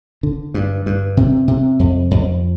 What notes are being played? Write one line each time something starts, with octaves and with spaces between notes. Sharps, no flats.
D3
G2
G2
C3
C3
F2
F2